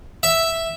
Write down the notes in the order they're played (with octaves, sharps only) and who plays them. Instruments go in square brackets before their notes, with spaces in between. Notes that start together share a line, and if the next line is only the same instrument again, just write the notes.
[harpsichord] E5